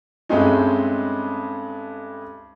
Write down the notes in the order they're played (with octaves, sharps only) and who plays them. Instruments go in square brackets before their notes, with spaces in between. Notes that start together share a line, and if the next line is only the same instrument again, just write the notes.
[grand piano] G2 G#3 A3 C4 C#4 D#4